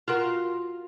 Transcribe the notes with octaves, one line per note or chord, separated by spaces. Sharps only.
F4 F#4 A#4